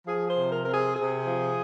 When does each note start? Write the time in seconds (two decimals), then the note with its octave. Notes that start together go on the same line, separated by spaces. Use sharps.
0.06 F3 G#4
0.28 C5
0.36 C3
0.51 A#4
0.65 C4 A#4
0.74 G#4
0.96 C3 G#4
1.26 F3